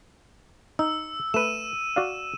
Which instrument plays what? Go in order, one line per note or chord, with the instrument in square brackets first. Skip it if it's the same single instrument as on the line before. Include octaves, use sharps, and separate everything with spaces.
[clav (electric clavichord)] D#4 [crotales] E6
[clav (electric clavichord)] A3 B4 [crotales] D#7 E7
[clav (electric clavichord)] F#4 D5 F5